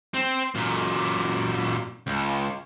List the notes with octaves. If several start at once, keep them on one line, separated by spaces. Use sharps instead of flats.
C4
F#2 A#2
C#2